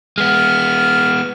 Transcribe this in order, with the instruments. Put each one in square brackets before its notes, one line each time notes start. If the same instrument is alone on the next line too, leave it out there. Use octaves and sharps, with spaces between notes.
[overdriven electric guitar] G#3 B3 [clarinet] F6